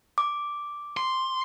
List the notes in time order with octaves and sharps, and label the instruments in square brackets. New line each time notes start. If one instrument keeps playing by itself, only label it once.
[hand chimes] D6
[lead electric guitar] C6